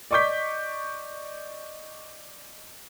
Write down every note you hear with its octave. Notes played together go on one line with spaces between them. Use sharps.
D5 D#5 C#6 D6 G6 B6